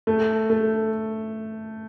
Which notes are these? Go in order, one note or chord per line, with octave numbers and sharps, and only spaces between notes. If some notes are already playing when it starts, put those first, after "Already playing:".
A3
A3